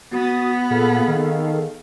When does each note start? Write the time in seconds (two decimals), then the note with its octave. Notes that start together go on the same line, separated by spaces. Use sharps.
0.12 B3 F#4 D#6 A6
0.71 A#2 G#4 A4 F5
1.08 D#3